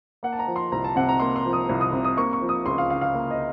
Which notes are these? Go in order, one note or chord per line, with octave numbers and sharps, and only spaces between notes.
A#3 F#5
A5
A#5
F3
C6
C2 A#5
A5
C3 F#5
A#5
A#3 C6
C6
F3
D#6
C2
D#6
C3
D#6
A#3 C#6
C#6
F3
D#6
C#2 C6
F5
C#3 F5
F5
A#3
D#5